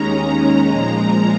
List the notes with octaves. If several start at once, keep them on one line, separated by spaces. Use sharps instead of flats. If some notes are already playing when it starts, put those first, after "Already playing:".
Already playing: D#2 D#3 G#3 C#4 A#5
A#2 F3 G#3